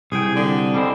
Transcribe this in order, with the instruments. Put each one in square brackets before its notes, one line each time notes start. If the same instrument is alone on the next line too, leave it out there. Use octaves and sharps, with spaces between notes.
[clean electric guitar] C2 G5 [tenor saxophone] G#4
[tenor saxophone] D3
[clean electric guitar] G3 G#3 C4